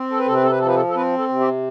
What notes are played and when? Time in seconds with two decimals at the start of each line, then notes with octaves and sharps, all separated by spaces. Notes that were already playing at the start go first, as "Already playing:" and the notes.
Already playing: C4
0.10 A4
0.19 B4
0.26 C3 A4
0.34 B4
0.43 A4
0.51 B4
0.59 F3 A4
0.67 B4
0.75 A4
0.89 A4
0.95 C4 B4
1.18 A4
1.29 C3
1.40 G4